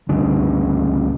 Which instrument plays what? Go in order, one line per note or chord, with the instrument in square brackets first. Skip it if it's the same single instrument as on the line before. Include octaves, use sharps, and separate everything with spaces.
[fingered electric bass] C#2 D3 G3 D4